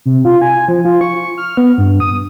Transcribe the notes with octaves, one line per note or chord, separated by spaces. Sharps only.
C3
F4
G#5
F3
F4
C#6
F6
B3
G2
D#6